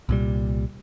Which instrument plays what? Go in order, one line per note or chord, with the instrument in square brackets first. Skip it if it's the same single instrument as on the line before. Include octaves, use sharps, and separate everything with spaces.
[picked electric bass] C2 A#2 G3